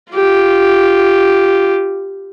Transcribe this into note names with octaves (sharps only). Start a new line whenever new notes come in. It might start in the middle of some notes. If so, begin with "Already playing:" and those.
F4 G4